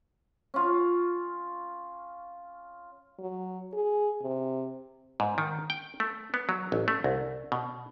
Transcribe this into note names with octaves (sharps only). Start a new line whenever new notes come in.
C#4 F4
F#3
G#4
C3
G#2
D#3
G5
A3
B3
F#3
A1
A3
C2
B2